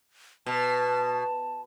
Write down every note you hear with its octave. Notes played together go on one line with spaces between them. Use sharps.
B2 A5